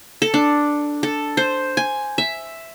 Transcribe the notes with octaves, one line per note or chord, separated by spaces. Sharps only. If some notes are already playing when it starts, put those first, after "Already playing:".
A4
D4
A4
C5
G#5
E5